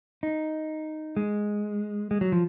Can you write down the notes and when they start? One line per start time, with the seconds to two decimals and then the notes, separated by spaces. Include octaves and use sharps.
0.23 D#4
1.17 G#3
2.11 G#3
2.21 F#3
2.32 F3